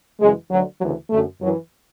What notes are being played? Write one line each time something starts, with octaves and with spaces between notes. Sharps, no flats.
F#2 C#3 E3 G#3
D2 D3 F#3
D2 C#3 E3 F#3
F#2 D3 A3
F#2 E3 F#3